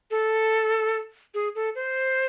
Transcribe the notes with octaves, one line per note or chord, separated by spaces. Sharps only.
A4
G#4
A4
C5